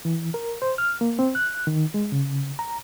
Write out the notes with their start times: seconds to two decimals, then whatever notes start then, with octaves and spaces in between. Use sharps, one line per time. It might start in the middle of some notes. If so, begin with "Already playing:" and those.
0.05 E3
0.34 A#4
0.62 C5
0.78 F6
1.01 A#3
1.19 C4
1.35 F#6
1.67 D#3
1.94 G#3
2.12 C#3
2.59 A#5